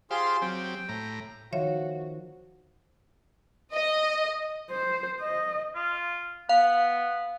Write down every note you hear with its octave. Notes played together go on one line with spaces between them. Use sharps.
F4 G4 G#4 C5 F5 C6
F#3 C4 G4 G5
A2 A#5
D#3 F3 F#4 C#5 E5 F5
D#5
C5
D#5
F4
B3 F5